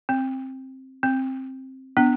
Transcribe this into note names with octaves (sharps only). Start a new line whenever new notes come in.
C4
C4
B3 D4